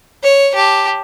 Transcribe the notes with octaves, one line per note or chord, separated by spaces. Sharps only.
C#5
G4 A5